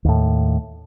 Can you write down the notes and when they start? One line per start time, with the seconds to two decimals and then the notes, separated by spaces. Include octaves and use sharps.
0.05 D#2 A2